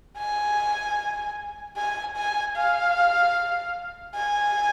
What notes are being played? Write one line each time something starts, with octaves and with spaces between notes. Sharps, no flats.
G#5
G#5
G#5
F5
G#5